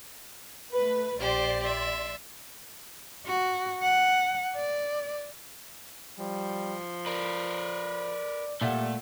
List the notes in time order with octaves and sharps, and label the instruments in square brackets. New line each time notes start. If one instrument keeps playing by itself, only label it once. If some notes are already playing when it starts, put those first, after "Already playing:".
[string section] A3 B4
[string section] A#1 D5 C6 [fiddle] G4 C5
[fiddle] E5
[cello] F#4
F#5
D5
[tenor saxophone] F3 [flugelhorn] G3
[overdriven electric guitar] A#4 B4 [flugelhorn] D5
[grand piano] A#2 E5 F#5 [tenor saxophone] G3 [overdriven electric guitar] A3